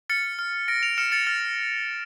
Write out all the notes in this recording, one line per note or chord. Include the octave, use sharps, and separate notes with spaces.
F6 A6 C#7
F6
F6 A#6 D7
D7 F7
F6 C#7 E7
A6 C#7
F6 A6